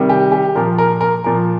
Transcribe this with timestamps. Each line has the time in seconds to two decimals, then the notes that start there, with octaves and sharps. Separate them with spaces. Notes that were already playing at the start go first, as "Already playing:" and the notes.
Already playing: C3 D#3 G3
0.09 G4
0.32 G4
0.55 A#2 F3 A#4
0.78 A#4
1.01 A#4
1.24 A#2 F3 A#4